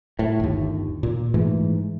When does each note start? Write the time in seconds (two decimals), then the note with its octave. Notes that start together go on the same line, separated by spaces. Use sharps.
0.19 A2
0.40 G1 D#2
1.03 A#2
1.34 G#2 E3 A3